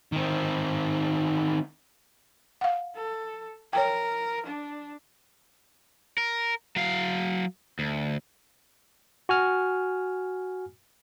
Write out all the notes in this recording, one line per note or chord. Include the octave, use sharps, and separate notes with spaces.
D#3 C4
F5 F#5
A4
A#4 C#5 G5
D4
A#4
F#3 F5
D2
F#4 G#5 F6